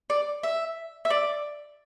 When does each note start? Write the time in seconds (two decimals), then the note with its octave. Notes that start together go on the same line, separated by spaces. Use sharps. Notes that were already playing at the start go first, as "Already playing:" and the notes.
0.10 D5
0.43 E5
1.05 E5
1.10 D5